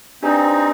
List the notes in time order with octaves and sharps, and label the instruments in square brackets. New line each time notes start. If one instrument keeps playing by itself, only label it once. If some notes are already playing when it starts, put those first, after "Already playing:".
[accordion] C4 D#4 [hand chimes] D4 G4 B4 D5 G#5